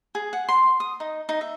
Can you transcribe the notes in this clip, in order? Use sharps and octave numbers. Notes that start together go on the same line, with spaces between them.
G#4
F#5
C6
D#6
D#4
D#4
E5